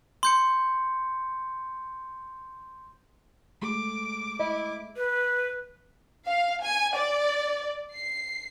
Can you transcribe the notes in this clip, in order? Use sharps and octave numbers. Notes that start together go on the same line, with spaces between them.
C6 G6 C#7
G#3 A3 G#4 D6
E4 D#5
B4
F5
G#5
D5
C7